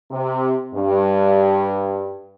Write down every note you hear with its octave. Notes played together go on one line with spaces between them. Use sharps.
C3
G2